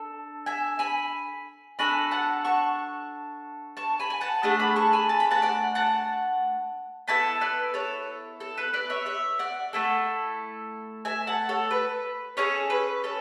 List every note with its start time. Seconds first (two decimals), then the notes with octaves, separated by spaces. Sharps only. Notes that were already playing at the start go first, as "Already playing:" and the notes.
Already playing: D4 A4
0.46 E5 G#5
0.79 G#5 B5
1.79 D4 F#4 A4 G#5 B5
2.11 F#5 A5
2.45 A5 C#6
3.77 A5 C#6
4.00 G#5 B5
4.10 G#5
4.21 F#5 A5
4.43 A3 D4 G#4 F#5 A5
4.60 B5 D6
4.76 A5 C#6
4.93 G#5 B5
5.09 A5
5.20 B5
5.31 F#5 A5
5.42 D5 F#5
5.75 F#5 A5
7.08 B3 E4 A4 A5 C#6
7.41 B4 D5
7.74 A4 C#5
8.40 A4
8.58 B4
8.74 B4 D5
8.90 C#5 E5
9.06 C#5 E5
9.39 D5 F#5
9.73 A3 E4 A4
11.05 E5 G#5
11.27 F#5 A5
11.49 A4 C#5
11.71 B4
12.37 C#4 G#4 A4 C#5
12.70 B4
13.04 A4 C#5